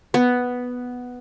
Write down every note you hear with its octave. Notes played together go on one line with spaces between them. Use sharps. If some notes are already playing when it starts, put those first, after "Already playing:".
B3